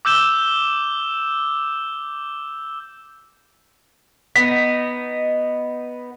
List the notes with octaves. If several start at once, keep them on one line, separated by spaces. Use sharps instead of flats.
D6 E6 G6 E7 G7
B3 D#4 B6